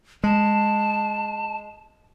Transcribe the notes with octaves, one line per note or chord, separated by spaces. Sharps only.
G#3 A5